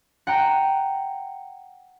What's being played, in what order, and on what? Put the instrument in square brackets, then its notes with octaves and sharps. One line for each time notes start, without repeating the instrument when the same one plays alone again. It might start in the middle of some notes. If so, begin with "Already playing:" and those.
[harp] F#5 G5 A#5